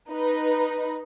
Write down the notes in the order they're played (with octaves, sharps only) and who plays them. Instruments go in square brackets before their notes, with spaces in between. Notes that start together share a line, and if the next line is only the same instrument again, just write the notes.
[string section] D#4 B4